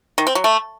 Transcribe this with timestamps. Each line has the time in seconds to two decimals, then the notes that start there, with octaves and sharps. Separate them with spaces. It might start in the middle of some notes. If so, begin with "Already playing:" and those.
0.18 D#3
0.27 C4
0.35 F#3
0.44 A3